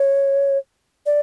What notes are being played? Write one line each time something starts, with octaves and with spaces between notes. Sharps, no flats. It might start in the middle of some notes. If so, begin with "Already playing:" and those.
Already playing: C#5
D5